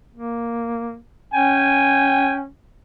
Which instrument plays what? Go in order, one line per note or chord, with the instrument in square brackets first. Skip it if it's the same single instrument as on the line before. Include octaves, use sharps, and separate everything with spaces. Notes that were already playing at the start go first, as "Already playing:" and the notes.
[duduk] A#3
[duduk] C#4 [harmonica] G5 G#5